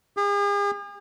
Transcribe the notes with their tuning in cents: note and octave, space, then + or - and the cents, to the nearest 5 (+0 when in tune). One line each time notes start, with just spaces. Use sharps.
G#4 -45